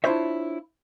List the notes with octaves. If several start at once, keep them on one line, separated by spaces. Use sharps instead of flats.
D4 E4 F4 C5 C#5 E5